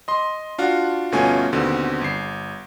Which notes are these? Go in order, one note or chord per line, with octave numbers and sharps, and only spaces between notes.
D#5 C6
D4 F4 F#4
G1 B2 A3 C#4 F4 G#5
D#2 B2 D3 C4
G1 C7